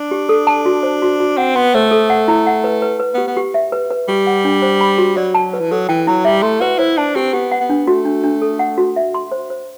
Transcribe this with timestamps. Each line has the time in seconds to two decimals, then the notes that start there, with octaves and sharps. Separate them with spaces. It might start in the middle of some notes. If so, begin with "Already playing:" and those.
Already playing: D4
0.11 G4
0.29 A4
0.47 A5
0.66 F#4
0.83 C5
1.02 F#4
1.20 F#4
1.37 C4 F#5
1.56 B3 C6
1.74 A3 C5
1.91 A4
2.10 F#5
2.28 E4
2.47 F#5
2.64 B4
2.82 B4
3.00 B4
3.14 B3 G4
3.27 B3
3.37 G4
3.54 E5
3.72 B4
3.90 B4
4.08 G3 G4
4.27 F#5
4.45 D4
4.62 C5
4.81 B5
4.98 F#4
5.17 F#3 D5
5.35 A5
5.54 B4
5.60 E3
5.71 F#3 A4
5.89 E3 G5
6.07 F#3 E4
6.25 G3 E5
6.43 A3 C6
6.61 F#4 B4
6.79 E4 C5
6.97 D4 A5
7.16 C4 G4
7.33 B3 G4
7.52 F#5
7.60 B3
7.70 D4
7.87 A3 F#4
8.05 D4
8.24 D4
8.42 A4
8.59 F#5
8.78 F#4
8.96 E5
9.14 C6
9.32 C5
9.50 C5